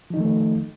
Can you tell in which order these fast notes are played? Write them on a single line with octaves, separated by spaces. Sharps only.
F3 D#4 D#3 A3